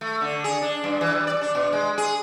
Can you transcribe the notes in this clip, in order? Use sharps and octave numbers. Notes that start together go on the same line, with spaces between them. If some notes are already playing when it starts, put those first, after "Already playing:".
A3
D3
G#4
D4
G2
E3
G3
D5
D4
B2
G#3
G#4